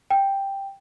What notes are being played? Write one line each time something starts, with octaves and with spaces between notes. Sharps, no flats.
G5